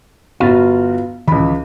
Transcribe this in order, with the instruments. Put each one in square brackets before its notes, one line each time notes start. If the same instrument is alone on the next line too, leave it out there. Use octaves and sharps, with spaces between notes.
[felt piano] G1 F#4 [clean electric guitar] F4 B4 F5
[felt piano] C#2 B5 [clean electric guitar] D#3 E3